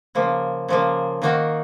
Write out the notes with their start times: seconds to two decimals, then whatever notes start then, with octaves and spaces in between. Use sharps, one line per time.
0.15 C#3 F3 A#3
0.68 C#3 F3 A#3
1.22 D#3 A#3 D#4 F#4